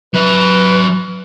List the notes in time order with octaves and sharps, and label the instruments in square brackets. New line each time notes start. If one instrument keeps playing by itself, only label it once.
[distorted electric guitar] F#3 E5 [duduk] B4